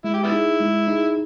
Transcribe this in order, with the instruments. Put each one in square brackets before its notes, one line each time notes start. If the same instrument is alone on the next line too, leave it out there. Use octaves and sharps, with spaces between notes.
[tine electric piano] G#3 [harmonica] E4
[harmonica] G4
G3 B3 E4
[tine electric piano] D#4 G#4
G#3
D#4 G#4